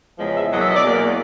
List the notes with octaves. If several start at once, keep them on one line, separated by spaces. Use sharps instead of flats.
E2 C#3 F3 G#3
E5
E2 B2 F#3 A#3 D#5
E5
D#5
D5
E2 B2 F#3 A#3